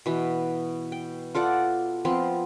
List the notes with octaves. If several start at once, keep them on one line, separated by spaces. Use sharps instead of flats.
B2 E3
G5
F4 A4 D5 F#5
F3 B3 C4